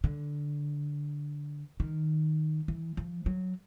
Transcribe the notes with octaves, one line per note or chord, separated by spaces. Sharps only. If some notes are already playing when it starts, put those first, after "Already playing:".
D3
D#3
E3
F3
F#3